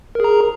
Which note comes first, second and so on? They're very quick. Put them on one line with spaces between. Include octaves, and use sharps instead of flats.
A#4 G#4 A#5